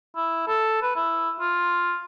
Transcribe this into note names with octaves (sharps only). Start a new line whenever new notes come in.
E4
A4
B4
E4
F4